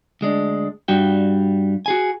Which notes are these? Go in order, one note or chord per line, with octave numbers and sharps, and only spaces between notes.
D2 G#3 D4
G2 G3 F#4 G5
F#4 G#4 G#5